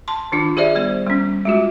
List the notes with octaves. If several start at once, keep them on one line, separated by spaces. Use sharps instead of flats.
A5 C6
D#3 D4 F4
G4 G#4 C5 D5 E5
G3 B3 C5
G3 C#4
G#3 F4 F#4